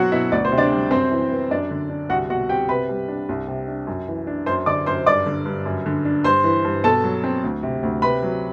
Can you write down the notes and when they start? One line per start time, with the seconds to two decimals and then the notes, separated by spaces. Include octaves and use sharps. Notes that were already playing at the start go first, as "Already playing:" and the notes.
Already playing: B2 F#3 F#4 F#5
0.12 B2 E4 E5
0.32 D2 D5
0.45 C5
0.52 C3
0.58 D4 D5
0.72 G3
0.91 F#2 C4 C5
1.11 E3
1.30 B3
1.50 F#2 D4 D5
1.71 D3
1.90 D4
2.09 C2 F#4 F#5
2.29 B2 F#4 F#5
2.49 C4 G4 G5
2.69 C3 B4 B5
2.89 G3
3.08 D4
3.29 C2
3.48 C3
3.68 D4
3.87 F#2
4.08 E3
4.27 D4
4.46 F#2 C5 C6
4.66 D3 D5 D6
4.86 F#2 C5 C6
5.06 G2 D5 D6
5.26 D3
5.45 G2
5.65 F#2
5.86 D3
6.05 D4
6.24 G2 C5 C6
6.44 E3
6.64 G2
6.84 B2 A4 A5
7.04 F#3
7.24 C4
7.44 D2
7.63 C3
7.83 D2
8.02 C3 B4 B5
8.23 F#3